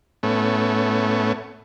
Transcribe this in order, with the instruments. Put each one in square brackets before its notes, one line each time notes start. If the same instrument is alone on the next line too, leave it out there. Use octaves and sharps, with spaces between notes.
[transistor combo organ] A2 A3 B3 C#4